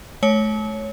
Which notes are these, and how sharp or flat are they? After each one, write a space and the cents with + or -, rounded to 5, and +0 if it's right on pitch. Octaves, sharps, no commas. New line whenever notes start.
A3 -40 C#5 +0